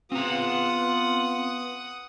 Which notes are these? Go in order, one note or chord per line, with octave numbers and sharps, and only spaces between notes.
B3 C4 F4 F#5 A#5 D#6